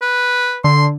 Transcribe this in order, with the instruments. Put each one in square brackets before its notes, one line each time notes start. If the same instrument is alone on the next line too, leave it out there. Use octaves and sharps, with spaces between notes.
[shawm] B4
[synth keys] D3 [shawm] C6